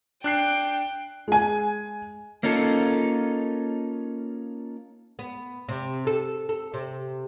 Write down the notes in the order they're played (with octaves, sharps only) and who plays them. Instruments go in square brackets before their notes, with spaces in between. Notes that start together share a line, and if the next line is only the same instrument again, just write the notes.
[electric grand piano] D4 F#6 C7 [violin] G5
[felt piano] G#3 G#5
[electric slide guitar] A#3 C#4 D#4 F4 A4
[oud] B3
C3
A4
A4
C3